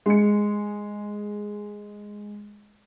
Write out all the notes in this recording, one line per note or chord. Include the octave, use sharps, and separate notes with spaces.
G#3 C#7